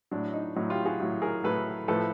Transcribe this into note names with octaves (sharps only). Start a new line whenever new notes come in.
A2 F#3 D4
D#4
A2 F#3 D#4
F4 G4
F#4 G#4
A2 F#3
G#4 A#4
A2 F#3 A4 B4
A2 F3 A4 B4